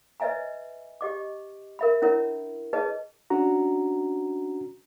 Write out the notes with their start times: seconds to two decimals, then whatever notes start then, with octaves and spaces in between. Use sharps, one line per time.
0.20 B4 C#5 D#5 E5 G#5 A#5
1.01 G4 D#5 D6
1.79 A#4 E5 B5
2.02 C#4 D4 E4 A#4 C#5
2.73 G#4 B4 C#5 D#5 A5
3.30 C#4 D4 F#4 A#5